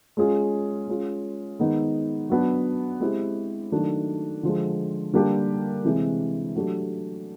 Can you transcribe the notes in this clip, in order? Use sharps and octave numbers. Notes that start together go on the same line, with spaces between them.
G#3 C#4 F4 G#4
G#3 C#4 F4 G#4
D#3 G#3 B3 D#4
F#3 B3 D4
G#3 C4 E4 G4
D#3 F#3 A3 D4
D3 F3 G#3
D3 G3 A#3 D4 G4
C3 E3 G#3 C4
F#3 A3 D4 G4